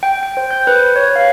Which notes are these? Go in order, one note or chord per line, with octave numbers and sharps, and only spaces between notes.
G5
G5
C5
G6
B4
C#5
F5